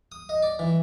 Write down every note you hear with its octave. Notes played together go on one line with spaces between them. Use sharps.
D#6
D#5
D5
E3